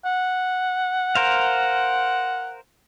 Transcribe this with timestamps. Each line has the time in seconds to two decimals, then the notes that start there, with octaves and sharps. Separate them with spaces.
0.06 F#5
1.15 A#4 C5 F5